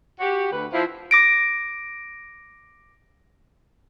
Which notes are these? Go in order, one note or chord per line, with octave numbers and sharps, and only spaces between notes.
F#4 G4
D2 B4
F3 E4
D6 A#6 D7